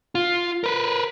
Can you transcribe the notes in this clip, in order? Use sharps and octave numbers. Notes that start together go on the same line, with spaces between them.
F4
A#4 B4